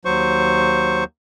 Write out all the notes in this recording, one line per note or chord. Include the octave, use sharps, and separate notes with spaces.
D#2 F#3 C5 C#6